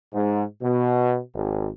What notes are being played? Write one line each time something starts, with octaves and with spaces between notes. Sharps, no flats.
G#2
B2
G#1